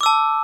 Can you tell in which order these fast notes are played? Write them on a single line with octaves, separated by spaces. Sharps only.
D6 E6 A5